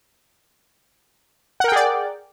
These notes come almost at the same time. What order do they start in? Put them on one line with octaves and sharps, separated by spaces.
F#5 A#4 G5 G#4 D5